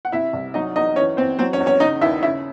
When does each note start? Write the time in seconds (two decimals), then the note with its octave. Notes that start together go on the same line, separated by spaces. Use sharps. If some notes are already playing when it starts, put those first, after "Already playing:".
0.05 F#5
0.12 C3 E4 E5
0.33 C2
0.54 F#3 D#4 D#5
0.76 E2 D#4 D#5
0.96 E3 C#4 C#5
1.17 E3 C4 C5
1.39 F#3 C4 C5
1.53 C#4 C#5
1.60 E2
1.66 C#4 C#5
1.80 C#3 D#4 D#5
2.01 D#2 E4 E5
2.23 C#3 E4 E5